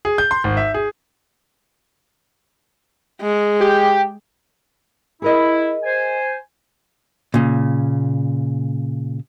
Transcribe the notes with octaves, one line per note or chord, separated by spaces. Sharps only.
G#4
G6
C6
G#1
E5
G#4
G#3
G4
E4 G#4 A#4 D#5
C5 G#5
A#2 C#3